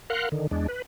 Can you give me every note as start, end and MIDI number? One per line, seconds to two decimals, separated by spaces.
0.10 0.29 70
0.10 0.29 77
0.10 0.29 78
0.10 0.29 84
0.10 0.29 90
0.32 0.47 50
0.32 0.47 51
0.51 0.67 40
0.51 0.67 56
0.51 0.67 62
0.68 0.82 71